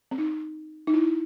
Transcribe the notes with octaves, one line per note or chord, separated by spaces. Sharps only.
C4
D#4
D#4
E4